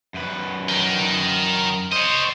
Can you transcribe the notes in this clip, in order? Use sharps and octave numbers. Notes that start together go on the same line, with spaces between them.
F#2 B4
A#4 G5
C5 C#5 D#5